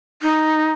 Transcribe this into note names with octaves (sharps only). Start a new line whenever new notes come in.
D#4